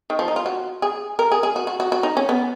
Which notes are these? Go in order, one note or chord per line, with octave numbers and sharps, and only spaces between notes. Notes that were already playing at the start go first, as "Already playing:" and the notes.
D#3
F3
D#4
F4
F#4
G#4
A#4
G#4
G#4
F#4
F#4
F#4
F#4
D#4
C#4
B3